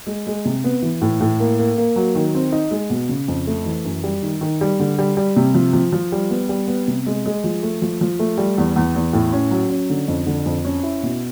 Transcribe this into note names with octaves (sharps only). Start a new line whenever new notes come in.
G#3
G#3
C3
B3
E3
A2
A2
A#3
A#3
A#3
F#3
D#3
C4
D#4
G#3
B2
C#3
F2
A3
E3
F#2
G3
D#3
D#3
G3
D3
G3
G3
C3
F3
F3
F3
G3
B3
G3
B3
C3
G#3
G#3
F3
A3
F3
F3
A3
G3
E2
E2
E2
A2
C#4
F#3
C#4
D3
F2
D3
F2
C#4
E4
B2